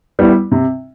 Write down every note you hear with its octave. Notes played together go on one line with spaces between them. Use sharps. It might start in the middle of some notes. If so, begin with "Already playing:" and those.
G3 B3 E4
C3